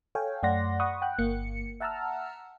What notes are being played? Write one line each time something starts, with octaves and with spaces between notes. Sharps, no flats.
A4 C#5 F5 G5 G#5
F#2 A3 D5 F#5 C6 A#6
F#5 B5 C#6 D#6
F#5 G5 F#6
G1 A#3 C#7
E5 F#5 A5 A#5 E6 F6